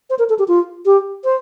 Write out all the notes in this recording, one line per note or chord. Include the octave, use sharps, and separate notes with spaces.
C5
A#4
A4
G4
F4
G4
C5